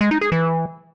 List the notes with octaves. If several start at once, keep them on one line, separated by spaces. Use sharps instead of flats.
G#3
D#4
G#4
E3